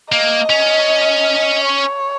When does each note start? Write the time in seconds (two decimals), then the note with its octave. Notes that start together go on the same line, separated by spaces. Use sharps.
0.11 A#3 D#5
0.50 C#4
1.65 C#5